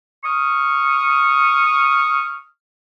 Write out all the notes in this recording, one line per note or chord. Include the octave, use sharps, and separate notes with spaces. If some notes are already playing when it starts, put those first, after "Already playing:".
C#6 D#6 F6